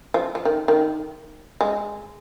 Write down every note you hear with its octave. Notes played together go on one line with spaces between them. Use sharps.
F3
F3
D#3
D#3
G#3